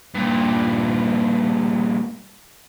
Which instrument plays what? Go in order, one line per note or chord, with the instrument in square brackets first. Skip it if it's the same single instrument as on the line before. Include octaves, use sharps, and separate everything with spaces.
[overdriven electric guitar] G2 A#2